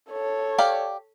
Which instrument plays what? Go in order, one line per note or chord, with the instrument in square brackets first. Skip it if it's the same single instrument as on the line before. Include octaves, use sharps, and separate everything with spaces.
[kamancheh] A4 C#5
[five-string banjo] G4 D5 F5